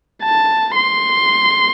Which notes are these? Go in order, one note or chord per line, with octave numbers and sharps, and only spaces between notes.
A5
C6